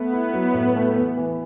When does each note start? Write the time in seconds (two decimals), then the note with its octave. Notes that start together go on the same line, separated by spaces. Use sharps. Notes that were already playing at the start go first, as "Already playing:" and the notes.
Already playing: A3 B3
0.13 E4
0.34 F#3
0.54 A2
0.76 A3
0.96 E2
1.17 E3